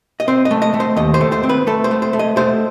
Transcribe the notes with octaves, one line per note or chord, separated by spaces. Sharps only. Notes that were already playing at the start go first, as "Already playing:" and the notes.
D#5
C4 C5
D#5
A3
D#5
A3
C5
D#2 D#5
C5
A3
C5
C4
B4
A3 A4
C5
A3
C5
A3
D#5
A3 C5